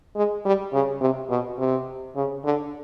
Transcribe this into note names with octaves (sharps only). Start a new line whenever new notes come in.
G#3
G3
C#3
C3
B2
C3
C#3
D3